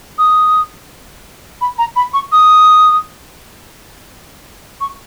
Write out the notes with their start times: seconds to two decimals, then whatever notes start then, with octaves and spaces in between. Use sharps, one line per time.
0.18 D#6
1.61 B5
1.78 A#5
1.96 B5
2.14 C#6
2.32 D#6
4.81 C#6